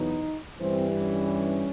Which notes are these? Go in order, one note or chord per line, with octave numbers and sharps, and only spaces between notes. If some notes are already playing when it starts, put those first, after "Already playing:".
Already playing: E2 B2 F#3 B3 D#4
G2 E3 G3 C4
C#4